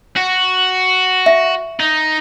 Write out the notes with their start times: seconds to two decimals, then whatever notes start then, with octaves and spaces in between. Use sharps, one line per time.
0.16 F#4
1.26 E5
1.80 D#4